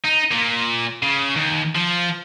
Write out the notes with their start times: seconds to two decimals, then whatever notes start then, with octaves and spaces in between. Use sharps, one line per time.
0.05 D#4
0.32 A#2
1.03 C#3
1.36 D#2
1.76 F3